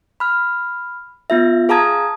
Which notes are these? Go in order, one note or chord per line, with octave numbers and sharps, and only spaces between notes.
B5 F6
B3 F4 E5
G#4 F5 A5 A#5 D#6 G#6